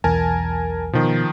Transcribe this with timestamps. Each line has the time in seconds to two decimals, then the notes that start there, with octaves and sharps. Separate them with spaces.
0.04 B1 E2 A#4 G#5 A5
0.93 B2 D#3 F3